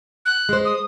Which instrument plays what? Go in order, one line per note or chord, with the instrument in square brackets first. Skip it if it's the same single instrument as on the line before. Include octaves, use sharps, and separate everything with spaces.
[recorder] F#6
[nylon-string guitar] G#3 C5
[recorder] D#6